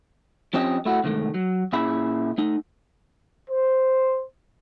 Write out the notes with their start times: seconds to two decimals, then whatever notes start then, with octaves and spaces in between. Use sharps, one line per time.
0.53 F3 C4 C#4 G4 D#5
0.85 A3 E4 F#4
1.04 C2 G2 D#3 G#3 A3
1.34 F#3
1.73 A#2 C#4 E4 G#4 E5 B5
2.38 A3 D#4
3.50 C5